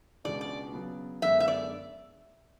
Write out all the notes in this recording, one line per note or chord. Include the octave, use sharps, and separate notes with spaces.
C#2 B2 G#3 D4 D5
D5
C#3 F#3 B3
F#2 D3 G#3 B3 D4 E5
E5
D5